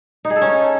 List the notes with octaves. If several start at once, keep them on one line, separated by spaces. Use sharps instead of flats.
D#4
G#4
A4
C#4